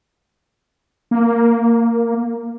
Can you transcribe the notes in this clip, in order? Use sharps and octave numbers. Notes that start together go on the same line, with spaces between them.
A#3